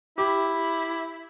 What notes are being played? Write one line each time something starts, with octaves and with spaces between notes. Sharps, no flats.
E4 G4